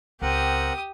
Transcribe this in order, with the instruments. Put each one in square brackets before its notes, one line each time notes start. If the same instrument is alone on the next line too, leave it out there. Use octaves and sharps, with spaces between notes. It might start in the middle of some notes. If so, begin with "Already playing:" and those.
[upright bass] C#2 [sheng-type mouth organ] C4 A#4 F#5 [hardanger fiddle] G4 D#6